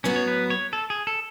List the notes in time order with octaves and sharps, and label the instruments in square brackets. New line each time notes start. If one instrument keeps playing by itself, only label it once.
[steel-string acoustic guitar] A2 F#3 B3 F#4 [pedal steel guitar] C#4
[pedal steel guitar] C#5
B4
C#5
A4
G#4
A4